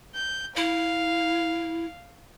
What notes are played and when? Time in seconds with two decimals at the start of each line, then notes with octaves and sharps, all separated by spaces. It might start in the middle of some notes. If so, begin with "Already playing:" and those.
0.15 G6
0.57 E4 F5